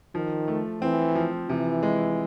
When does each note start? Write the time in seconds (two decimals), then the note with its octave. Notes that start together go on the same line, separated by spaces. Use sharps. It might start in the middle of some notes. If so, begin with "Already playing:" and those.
0.15 D#3 F3
0.48 A3
0.81 E3 C4
1.15 F3
1.49 C3 E3
1.83 G#3